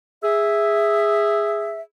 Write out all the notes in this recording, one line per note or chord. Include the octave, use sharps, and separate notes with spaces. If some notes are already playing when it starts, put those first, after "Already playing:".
G#4 E5